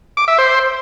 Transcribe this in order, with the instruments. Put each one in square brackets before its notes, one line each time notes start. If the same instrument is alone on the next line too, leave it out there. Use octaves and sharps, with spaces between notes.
[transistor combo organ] D6
E5
C5